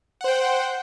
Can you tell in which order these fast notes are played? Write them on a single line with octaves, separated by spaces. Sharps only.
F#5 C5 G5